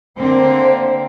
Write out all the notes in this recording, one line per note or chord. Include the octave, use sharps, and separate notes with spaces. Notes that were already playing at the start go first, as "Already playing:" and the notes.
D3 A#3 C4 C5